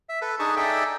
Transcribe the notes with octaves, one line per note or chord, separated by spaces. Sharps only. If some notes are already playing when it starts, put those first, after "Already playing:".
E5
A4 B4
D4 D#4 G#4 A5 C#6
D#4 G#4 A4 D5 E5 G5